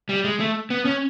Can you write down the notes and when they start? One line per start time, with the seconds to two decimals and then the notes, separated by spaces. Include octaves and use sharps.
0.09 G3
0.24 G#3
0.40 A3
0.70 B3
0.85 C#4